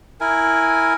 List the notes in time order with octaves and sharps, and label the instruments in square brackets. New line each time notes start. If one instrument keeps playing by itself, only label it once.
[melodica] E4 A#4 G#5